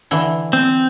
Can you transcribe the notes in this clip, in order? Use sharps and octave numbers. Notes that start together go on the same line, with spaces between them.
D3 E3
C4